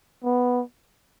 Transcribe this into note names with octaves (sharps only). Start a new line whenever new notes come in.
B3